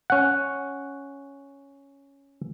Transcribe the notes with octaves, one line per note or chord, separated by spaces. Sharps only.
C#4 F#5